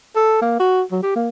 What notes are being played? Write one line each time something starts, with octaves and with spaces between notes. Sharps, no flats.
A4
A#3
F#4
F#3
G4
A#3